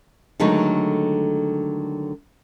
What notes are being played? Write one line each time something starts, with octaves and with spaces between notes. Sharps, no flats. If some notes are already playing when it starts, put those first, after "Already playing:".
D3 D#3 F#3 G#3 A3 D#4